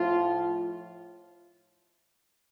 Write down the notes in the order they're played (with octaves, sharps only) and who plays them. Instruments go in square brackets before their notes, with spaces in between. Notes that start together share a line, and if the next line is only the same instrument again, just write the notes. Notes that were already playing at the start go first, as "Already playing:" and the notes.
Already playing: [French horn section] A2 F3 F4